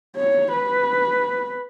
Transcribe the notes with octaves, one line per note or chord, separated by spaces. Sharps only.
C#5
B4